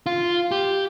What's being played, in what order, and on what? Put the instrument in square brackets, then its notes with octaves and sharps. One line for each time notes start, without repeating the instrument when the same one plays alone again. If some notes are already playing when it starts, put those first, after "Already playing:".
[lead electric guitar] F4
G4